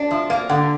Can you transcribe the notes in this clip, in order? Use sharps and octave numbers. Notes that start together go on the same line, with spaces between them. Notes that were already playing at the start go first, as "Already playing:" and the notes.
Already playing: D4 D5
F3 E5
A#3 F5
D3 F#5